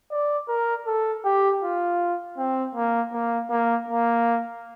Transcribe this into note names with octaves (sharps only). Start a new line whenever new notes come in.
D5
A#4
A4
G4
F4
C4
A#3
A#3
A#3
A#3